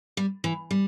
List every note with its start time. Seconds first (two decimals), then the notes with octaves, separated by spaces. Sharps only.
0.17 G3
0.44 E3
0.71 G3